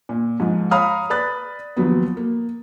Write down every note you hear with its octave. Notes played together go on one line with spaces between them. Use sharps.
A#2
G#2 F3
C#5 F5 A#5 B5 D#6 F6
B4 D5 B5 F#6 A6
D#2 F3 F#3 B3
A#3